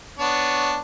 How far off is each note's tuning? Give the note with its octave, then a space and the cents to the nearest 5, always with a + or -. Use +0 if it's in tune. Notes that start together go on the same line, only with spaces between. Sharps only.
B3 +0 D4 +0 C#5 +0